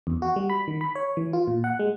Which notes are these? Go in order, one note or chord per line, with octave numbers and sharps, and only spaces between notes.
E2
F#4
G3
B5
D#3
B5
C#5
E3
F4
A#2
F#5
G#3